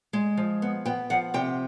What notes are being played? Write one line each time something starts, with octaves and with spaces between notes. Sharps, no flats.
G#3
F3
B3
B3 G5
F3 F#5
C3 G5